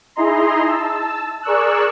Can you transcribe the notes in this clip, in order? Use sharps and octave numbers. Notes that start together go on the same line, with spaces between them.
D#4 E4 G#4 D#5 A#5 C6
A5 E6
G#4 A#4 D5 C#6 E6 F#6